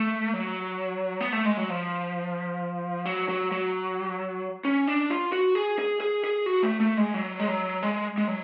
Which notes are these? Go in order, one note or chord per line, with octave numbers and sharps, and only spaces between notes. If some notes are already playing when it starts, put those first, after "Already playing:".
Already playing: A3
F#3
B3
A3
G#3
F#3
F3
F#3
F#3
F#3
C#4
D4
F4
F#4
G#4
G#4
G#4
G#4
F#4
A3
A3
G#3
F#3
G#3
F#3
G#3
G#3
F#3